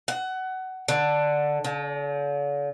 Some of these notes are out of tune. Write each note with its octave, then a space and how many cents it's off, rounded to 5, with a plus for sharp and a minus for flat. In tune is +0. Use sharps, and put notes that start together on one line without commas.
F#5 +20
D3 +5
D3 -45